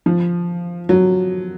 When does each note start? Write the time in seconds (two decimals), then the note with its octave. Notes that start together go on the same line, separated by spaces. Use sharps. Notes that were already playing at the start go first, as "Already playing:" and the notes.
0.06 F3
0.89 F#3